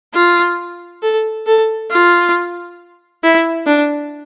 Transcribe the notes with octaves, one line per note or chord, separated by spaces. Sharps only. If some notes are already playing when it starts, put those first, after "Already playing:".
F4
A4
A4
F4
E4
D4